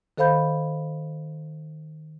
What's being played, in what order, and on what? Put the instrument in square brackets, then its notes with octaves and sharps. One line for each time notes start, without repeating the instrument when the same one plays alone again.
[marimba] D#3 A4 C5 F5 B5 G6